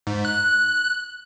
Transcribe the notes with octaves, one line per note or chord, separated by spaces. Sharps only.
G#2
F#6